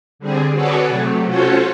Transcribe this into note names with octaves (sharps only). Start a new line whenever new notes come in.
D3 G3 C4 G#4
F#4 G#4 A4 B4 C#5 D5
C3 F#3 A3
C#4 F4 F#4 A4 C5 C#5